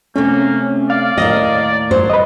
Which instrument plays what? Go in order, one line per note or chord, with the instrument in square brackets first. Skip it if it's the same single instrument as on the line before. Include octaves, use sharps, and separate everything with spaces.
[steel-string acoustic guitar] C3 A3 [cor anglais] A#3 [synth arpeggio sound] C#4
[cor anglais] D5 [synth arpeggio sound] F5
[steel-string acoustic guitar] D#2 A2 A#4 [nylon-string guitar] D#5
[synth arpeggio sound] G2 [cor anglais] F#3 [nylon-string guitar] C5
[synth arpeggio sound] B4 D#5